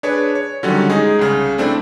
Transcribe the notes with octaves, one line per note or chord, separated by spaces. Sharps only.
D4 G#4 B4 C#5
C#5
D3 D#3 F#3 G3 C#4
G#3 D#4 G#4
C2 C#3
A3 C4 D4 E4